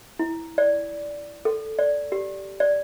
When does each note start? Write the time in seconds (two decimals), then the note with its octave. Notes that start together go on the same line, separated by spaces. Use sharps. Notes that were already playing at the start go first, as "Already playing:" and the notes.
0.19 E4
0.58 D5
1.45 A4
1.79 D5
2.12 G4
2.60 D5